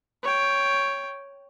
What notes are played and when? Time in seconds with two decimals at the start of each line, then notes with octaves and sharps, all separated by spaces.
0.23 C#5 G5